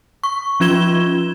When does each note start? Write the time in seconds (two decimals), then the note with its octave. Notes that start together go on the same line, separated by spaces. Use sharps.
0.23 C#6
0.60 F3 C#4 F4 G#6 E7 G7